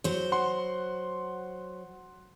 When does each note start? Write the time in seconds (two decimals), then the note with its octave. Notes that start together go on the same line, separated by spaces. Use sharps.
0.04 F#3 C5
0.32 F#5 C6